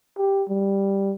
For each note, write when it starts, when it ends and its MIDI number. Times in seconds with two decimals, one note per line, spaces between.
0.18 0.43 67
0.49 1.14 55